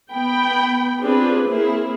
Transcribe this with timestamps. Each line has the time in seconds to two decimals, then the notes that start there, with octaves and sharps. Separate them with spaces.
0.11 B3 G5 B5
1.01 C4 D4 F4 G4 G#4 B4
1.47 A#3 C4 E4 G#4